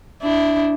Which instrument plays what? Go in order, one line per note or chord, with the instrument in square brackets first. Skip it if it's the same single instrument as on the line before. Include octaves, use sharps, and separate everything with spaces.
[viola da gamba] D4 E4